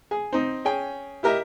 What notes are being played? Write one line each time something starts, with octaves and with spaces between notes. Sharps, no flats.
G#4
C4 D#4
C#4 G#4 G5
E4 G4 A#4 D#5 E5